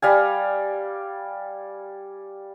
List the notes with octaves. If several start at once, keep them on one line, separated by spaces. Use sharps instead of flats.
G3 F5 G#5